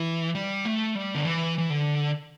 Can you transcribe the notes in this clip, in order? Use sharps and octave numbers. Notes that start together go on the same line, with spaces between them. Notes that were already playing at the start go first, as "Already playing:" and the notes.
Already playing: E3
G3
A3
G3
D3
E3
E3
D3